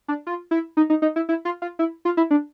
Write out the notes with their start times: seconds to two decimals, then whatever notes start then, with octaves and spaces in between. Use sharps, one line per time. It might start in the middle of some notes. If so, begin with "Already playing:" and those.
0.08 D4
0.27 F4
0.51 E4
0.77 D#4
0.90 D#4
1.02 D#4
1.16 E4
1.29 E4
1.45 F4
1.62 F4
1.79 E4
2.05 F4
2.17 E4
2.31 D4